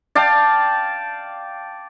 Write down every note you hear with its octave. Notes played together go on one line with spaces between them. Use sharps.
D5 F5 G5 A5